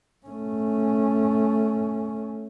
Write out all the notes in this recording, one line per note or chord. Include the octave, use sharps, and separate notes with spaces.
A3 C#4